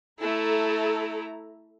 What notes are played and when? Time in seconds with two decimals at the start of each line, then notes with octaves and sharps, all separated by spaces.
0.21 A3 E4 A4 A#5